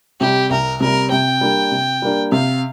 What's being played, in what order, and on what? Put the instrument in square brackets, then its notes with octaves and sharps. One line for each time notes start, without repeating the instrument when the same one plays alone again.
[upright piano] C3 G3 [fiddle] G4
[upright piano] C2 [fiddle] A#4
[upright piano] C3 G3 [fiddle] A#4
[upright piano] C3 [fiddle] G5
[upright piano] G3 A#3 D4
C3
G3 A#3 D4
[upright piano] C3 [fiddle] F5